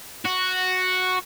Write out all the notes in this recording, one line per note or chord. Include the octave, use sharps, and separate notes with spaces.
F#4